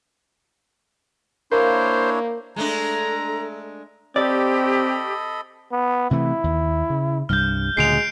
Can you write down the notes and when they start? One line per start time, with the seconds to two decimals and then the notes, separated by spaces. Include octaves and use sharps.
1.52 A#3 D4 E4 C5 C#5
2.56 G#3 A3 D4 A4 A#5
4.16 C4 G4 A4 D5 D#5 B5
5.72 B3
6.11 C3 E3 A3 E4
6.44 D#2
6.90 C#3
7.29 C2 G2 F6 G6
7.77 D2 A#2 C#3 G#3 C7 D7 F7